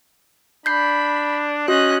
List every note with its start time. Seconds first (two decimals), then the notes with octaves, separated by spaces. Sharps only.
0.66 D4 B5 G6 C7
1.68 C#4 F#4 D#5 F#6